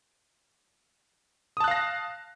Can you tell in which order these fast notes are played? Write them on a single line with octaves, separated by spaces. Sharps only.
D#6 A5 F#6 F5 A#6